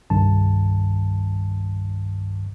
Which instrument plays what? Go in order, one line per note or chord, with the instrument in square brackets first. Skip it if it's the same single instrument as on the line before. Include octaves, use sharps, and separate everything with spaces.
[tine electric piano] C2 G2 D#3 A5